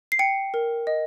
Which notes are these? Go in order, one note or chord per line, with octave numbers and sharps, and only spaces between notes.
C7
G5 C#7
A#4
D#5